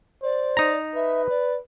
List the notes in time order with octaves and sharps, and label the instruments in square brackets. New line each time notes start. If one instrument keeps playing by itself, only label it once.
[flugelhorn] C5 [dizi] D5
[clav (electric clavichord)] D#4 A#5
[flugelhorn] B4 [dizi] E5
[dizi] D5